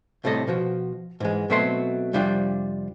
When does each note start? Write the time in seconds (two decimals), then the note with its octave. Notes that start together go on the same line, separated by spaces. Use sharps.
0.24 C2 A2 C3 A4 D#5
0.47 B2 F3 F#4
1.20 G#2 E3 G#3
1.50 B2 F#3 A3 C4 C6
2.13 F2 C3 G3 D4 F4 G5